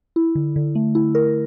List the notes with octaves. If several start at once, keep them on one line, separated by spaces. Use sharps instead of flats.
E4
D3
D3
A3
E4
A#4